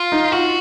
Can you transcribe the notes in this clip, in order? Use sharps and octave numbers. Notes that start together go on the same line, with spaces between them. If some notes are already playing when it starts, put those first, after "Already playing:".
Already playing: F4
D#4
F4 F#4